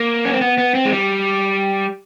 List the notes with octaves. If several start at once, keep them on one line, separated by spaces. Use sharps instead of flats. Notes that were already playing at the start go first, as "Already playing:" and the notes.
Already playing: A#3
C#4
C4
B3
B3
C4
G#3
G3